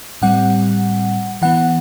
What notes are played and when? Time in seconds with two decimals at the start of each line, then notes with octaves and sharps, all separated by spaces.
0.22 A2 G3 C4 F#5
1.42 E3 B3 F#5